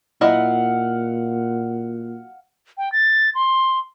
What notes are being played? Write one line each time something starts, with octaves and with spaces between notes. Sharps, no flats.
A#2 F#3 E4 D#5 F5 F#5
G5
A6
C6